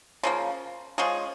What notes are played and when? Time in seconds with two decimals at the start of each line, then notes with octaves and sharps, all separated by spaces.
0.23 C#3 F3 A#3
0.98 F3 G#3 C#4 G#4